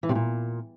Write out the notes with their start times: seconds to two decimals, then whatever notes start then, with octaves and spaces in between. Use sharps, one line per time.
0.03 E3
0.09 C3
0.15 A#2